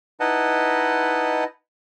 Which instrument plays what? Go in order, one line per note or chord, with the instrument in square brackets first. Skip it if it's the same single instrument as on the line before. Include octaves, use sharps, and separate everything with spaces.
[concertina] D#4 E4 B4 D#5 F#5 A5